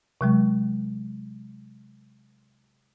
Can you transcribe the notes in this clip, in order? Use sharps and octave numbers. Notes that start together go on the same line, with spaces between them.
C3 F#3 G#3